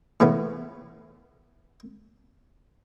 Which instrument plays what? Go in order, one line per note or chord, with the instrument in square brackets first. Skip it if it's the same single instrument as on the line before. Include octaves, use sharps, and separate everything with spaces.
[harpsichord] A2 C#3 E3 B3